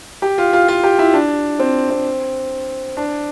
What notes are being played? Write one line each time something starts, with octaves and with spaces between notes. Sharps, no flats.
G4
F4
F4
F4
G4
E4
D4
C4
C4
D4